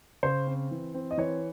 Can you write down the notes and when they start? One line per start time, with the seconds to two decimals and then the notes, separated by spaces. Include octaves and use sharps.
0.23 C#3 C5
0.47 C4
0.71 E3
0.94 C4
1.11 D#5
1.18 E3 C#5